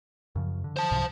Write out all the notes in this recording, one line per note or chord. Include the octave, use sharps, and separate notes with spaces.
F#2 C#3 F3
D3
C5 A5
C2 G#2 C3